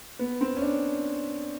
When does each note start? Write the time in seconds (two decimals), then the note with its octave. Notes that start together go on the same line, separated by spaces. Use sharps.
0.19 B3
0.41 C4
0.56 C#4
0.62 D4